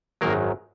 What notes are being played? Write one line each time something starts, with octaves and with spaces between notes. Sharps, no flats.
G#1 F#2 D#3 F#3 A#3 A#4